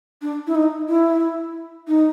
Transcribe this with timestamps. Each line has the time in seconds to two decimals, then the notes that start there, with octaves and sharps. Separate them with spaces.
0.22 D4
0.47 E4
0.55 D#4
0.88 E4
1.88 D#4